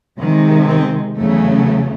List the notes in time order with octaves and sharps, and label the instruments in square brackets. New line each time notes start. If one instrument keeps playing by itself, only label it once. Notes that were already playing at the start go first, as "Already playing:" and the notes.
[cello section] C3 D#3 G#3
C4
E2 C#3 F#3 A3